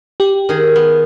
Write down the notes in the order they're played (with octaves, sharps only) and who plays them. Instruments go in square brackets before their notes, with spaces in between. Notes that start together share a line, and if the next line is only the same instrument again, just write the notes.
[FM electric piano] G4
[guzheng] D#3 G#4
B3